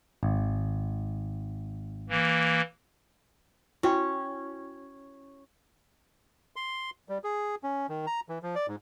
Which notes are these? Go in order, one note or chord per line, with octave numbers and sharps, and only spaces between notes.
G#1
E3 A#3
C#4 E4 F#4 G5
C6
G3
G#4
C#4
D#3
A#5
E3
F3
D5
G#2